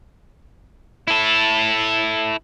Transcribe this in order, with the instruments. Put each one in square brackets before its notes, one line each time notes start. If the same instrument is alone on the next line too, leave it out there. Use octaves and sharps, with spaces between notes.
[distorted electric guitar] E4 A4